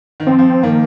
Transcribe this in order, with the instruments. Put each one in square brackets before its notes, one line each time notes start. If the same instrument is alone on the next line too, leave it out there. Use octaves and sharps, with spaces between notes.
[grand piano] D#3
[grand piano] F3 [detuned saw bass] C4
[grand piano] F3
[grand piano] D#3 [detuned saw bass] A#3